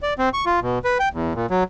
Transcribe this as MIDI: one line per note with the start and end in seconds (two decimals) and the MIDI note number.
0.03 0.14 74
0.19 0.29 60
0.34 0.45 85
0.46 0.60 65
0.62 0.79 47
0.84 0.98 71
1.00 1.09 79
1.14 1.33 40
1.34 1.46 46
1.51 1.64 54